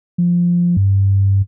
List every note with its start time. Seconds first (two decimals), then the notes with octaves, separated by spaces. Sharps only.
0.18 F3
0.77 G2